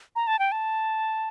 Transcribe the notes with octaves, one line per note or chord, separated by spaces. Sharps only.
A#5
A5
G5
A5